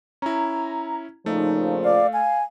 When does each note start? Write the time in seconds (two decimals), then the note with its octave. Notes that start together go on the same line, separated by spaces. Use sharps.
0.22 C#4 E4 A#5
1.26 A#2 C#3 F3 A3 D#4
1.84 D5 F5
2.13 F5 G#5